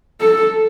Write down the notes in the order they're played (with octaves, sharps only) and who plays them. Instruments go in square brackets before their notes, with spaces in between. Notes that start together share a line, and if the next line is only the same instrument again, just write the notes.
[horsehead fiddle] A4